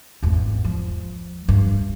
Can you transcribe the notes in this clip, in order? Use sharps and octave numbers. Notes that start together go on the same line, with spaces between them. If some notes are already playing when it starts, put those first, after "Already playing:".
G#1 E2
F3
G2